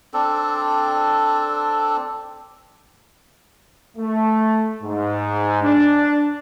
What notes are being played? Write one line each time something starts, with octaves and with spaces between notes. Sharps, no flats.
C4 D4 A4
A3
G#2
D4